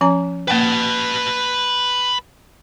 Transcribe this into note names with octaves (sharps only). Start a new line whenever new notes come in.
F3 C#4 A#5
A#3 B4 F#5 G5 A5